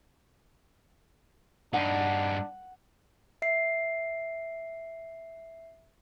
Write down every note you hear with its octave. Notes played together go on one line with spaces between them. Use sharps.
G2 D4 D#4 F#5
E5 C7